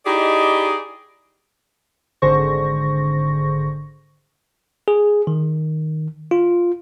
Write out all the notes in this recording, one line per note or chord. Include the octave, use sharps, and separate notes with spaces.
D#4 E4 G4 G#4 D5 D#5
G#1 D3 G#4 C5 C#6 A#6
G#4
D#3
F4